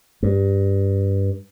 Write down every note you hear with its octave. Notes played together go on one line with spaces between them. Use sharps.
G2